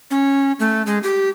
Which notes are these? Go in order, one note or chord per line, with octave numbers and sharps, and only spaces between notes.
C#4
A3
G#3
G4